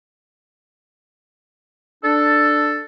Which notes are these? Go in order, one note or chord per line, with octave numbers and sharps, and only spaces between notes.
D4 A4